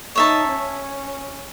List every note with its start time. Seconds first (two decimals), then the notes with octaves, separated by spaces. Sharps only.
0.15 D#4 C#5 E5 A5
0.48 C#4